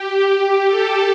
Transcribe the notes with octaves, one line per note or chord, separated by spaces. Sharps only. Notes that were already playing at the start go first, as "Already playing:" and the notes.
Already playing: G4
G4
A4